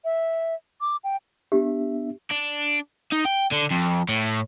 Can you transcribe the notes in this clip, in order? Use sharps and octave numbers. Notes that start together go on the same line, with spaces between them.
E5
D6
G5
B3 D4 G4 E5
D4
D#4
G5
D3
F2
A2